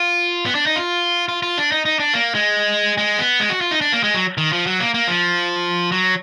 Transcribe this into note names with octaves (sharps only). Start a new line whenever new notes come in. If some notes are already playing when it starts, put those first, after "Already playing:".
Already playing: F4
B3
D4
D#4
F4
F4
F4
D4
D#4
D#4
D4
A#3
G#3
G#3
B3
G#3
F#4
F4
D#4
D4
A#3
G#3
F#3
D#3
F3
F#3
A#3
A#3
F3
F#3